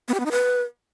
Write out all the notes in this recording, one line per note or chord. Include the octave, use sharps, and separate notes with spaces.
B3
G4
B3
D#4
B4